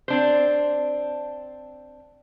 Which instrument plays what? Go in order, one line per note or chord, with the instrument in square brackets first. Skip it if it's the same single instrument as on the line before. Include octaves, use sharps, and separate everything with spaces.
[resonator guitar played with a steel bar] C4 D4 C5